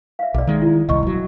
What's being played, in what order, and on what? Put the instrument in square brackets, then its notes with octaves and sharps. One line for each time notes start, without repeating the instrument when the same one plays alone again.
[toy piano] E5 F5
[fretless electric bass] B1 [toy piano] G#4 D5
[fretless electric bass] D#3 G#3
[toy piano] E4
[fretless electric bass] D#1 C2 [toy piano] D#5 C#6
[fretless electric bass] E1 F#3